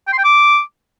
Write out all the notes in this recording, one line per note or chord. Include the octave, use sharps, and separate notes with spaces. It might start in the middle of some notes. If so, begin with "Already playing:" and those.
G5
C6
G5
D6